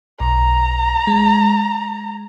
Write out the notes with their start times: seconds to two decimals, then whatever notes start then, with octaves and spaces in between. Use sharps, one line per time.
0.20 B1 A#5
1.07 G#3